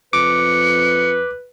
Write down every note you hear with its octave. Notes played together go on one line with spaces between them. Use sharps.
F2 B4 D6 C#7